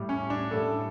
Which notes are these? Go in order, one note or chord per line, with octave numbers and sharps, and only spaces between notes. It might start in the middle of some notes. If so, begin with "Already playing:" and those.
Already playing: A2 G3
C#4
D4
A2 G3 A4